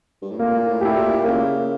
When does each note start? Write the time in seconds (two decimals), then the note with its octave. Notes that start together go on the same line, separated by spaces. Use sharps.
0.22 G2
0.31 A2
0.39 A#2 A#3
0.67 A2
0.81 E4 G4
0.95 A#2
1.24 C#3 A#3